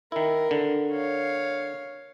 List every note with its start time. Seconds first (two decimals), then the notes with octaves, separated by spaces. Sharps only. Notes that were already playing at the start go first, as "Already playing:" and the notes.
0.12 D#3 E4 A#4
0.51 D3
0.91 C#5 F5